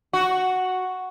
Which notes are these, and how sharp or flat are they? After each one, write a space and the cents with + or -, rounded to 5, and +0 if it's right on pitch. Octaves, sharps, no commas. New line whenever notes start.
F#4 +0